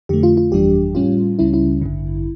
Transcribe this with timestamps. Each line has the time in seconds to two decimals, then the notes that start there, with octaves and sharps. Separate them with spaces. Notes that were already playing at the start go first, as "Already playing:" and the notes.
0.09 F2 D3 A3 G4
0.23 F4
0.37 F4
0.51 G1 F2 E3 G3 D4 G4
0.95 A2 G3 C#4 F4
1.39 C#2 C#3 G3 C#4 E4
1.54 E4
1.82 A1 G2 D3